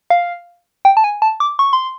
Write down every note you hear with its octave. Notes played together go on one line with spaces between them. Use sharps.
F5
G5
A5
G#5
A5
D6
C#6
C6